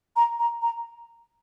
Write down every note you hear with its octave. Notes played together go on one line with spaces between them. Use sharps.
A#5
A#5
A#5